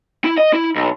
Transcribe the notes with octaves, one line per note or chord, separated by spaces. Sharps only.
E4
D#5
E4
B1